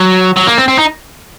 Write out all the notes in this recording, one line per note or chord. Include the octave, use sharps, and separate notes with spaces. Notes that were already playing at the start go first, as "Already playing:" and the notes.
Already playing: F#3
F#3
A#3
C4
C4
D#4